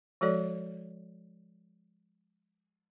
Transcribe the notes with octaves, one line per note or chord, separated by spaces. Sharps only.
F3 G#3 F#4 A4 C#5 D5